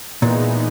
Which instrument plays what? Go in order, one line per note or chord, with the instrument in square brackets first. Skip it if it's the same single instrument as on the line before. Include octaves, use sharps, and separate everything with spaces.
[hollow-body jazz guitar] A#2 [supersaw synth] E3 G#3 B3 D#4